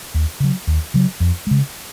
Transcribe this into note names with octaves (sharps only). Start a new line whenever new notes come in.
D#2
C#3 F#3
D#2
C#3 F#3
F2
C#3 G#3